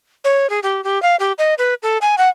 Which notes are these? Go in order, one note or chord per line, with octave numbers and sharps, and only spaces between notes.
C#5
G#4
G4
G4
F5
G4
D#5
B4
A4
G#5
F#5